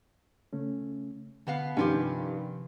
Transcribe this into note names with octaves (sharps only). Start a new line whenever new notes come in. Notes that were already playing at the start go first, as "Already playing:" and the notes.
C#3 A3 C#4
B2 D3 B3 F5
G2 C3 D#3 F3 C#4 F4 G4